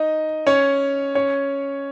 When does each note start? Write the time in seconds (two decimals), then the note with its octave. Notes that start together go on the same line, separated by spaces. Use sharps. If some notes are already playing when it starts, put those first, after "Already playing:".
Already playing: D#4 D#5
0.47 C#4 C#5
1.15 C#4 C#5